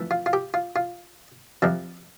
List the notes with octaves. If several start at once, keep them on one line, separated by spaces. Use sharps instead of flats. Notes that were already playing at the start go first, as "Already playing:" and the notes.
Already playing: F2 E3 A3
F4
F4
G4
F4
F4
F2 C3 F3 C4